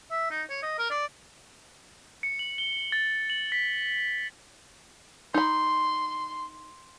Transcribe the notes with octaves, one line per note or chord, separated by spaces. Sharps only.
E5
D#4
C#5
D#5
A#4
D5
C#7
F#7
G7
A6
F#7
B6
D#4 B5 C6